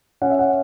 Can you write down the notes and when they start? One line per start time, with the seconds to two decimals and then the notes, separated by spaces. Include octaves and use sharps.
0.22 C#4 F#5
0.30 E5
0.39 F#5